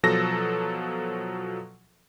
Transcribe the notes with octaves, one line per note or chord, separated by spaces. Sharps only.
B2 F3 F#3 A4 A#6